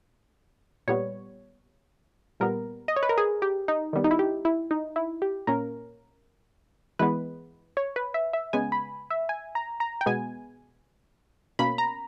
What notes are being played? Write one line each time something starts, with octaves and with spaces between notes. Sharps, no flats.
A#2 G3 B3 C#5
A#2 G3 B3 A#4
D#5
C#5
B4
A#4
G#4
G4
D#4
D#3 G3 B3
D#4
E4
G4
E4
D#4
E4
G4
A#2 A#3 C#4 A#4
E3 G#3 B3 B4
C#5
B4
E5
E5
C#3 G#3 B3 G#5
B5
E5
G#5
A#5
A#5
G5
B2 G#3 B3 G#5
B2 A#3 C#4 B5
A#5